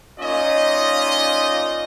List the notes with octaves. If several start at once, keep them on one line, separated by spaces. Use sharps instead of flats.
A#3 C#4 D#4 F4 D5 D#5